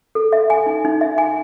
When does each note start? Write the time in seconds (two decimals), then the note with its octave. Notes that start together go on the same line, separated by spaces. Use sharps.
0.15 A4
0.33 E5
0.50 G#5
0.66 D#4
0.85 D#4
1.01 E5
1.18 G#5